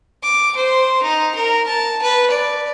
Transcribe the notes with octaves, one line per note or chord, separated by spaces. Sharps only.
D6
C5
D#4
A#4
A5
B4
D5